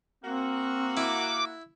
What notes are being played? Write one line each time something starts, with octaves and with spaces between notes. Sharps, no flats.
A#3 C4 F#4
E4 D6